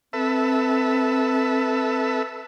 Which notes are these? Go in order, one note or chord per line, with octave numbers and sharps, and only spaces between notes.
C4 A4 B4 E5